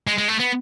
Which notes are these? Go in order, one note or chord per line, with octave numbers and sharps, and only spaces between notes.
G#3
G#3
A3
B3